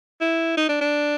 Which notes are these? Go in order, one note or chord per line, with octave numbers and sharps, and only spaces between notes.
E4
D#4
D4
D4